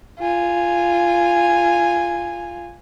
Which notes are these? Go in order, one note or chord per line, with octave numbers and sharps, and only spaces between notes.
F4 G#5